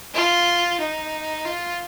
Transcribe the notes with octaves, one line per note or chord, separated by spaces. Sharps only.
F4
D#4
F4